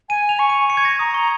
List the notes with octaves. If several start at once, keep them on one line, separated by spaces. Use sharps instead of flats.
G#5 D#7
F7
C#6
D#7
C#6 C#7
G#6
A#6
A#5 D#6
C#6